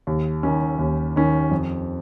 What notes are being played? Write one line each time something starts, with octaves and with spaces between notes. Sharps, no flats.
D#2
D#3 C#4
D#2
D#3 C#4
F2